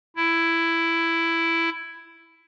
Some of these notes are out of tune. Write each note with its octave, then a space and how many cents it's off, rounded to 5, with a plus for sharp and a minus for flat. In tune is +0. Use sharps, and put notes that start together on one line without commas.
E4 +10